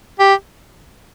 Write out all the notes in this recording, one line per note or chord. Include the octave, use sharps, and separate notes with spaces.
G4